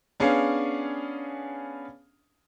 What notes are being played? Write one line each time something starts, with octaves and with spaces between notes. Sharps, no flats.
B3 C#4 D4 G#4 F5